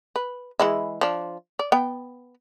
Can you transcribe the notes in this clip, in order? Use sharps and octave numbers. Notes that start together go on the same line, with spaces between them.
B4
E3 G#3 E4
F3 D4
D5
B3 G5